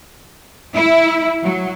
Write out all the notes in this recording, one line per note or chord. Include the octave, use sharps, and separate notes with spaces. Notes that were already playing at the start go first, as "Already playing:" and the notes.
E4
F#3